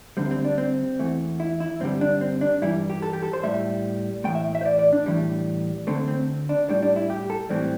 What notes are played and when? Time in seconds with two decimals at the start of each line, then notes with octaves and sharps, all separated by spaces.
0.17 D2 D3 G3 C4
0.31 C4
0.44 D4
0.58 C4
0.99 E2 E3 A3
1.40 E4
1.60 E4
1.80 G2 D3 G3 C4
2.01 D4
2.21 C4
2.41 D4
2.62 G2 E3 G3 E4
2.90 G4
3.02 A4
3.13 G4
3.23 A4
3.33 C5
3.43 A2 G3 E5
4.24 A2 E3 A3 G5
4.35 E5
4.55 E5
4.61 C5
4.65 D5
4.79 D5
4.93 D4
5.06 A2 E3 G3
5.87 D2 D3 A3 C4
6.08 C4
6.49 D4
6.69 A2 G3 D4
6.83 D4
6.96 E4
7.10 G4
7.30 A4
7.49 A2 E3 G3 C4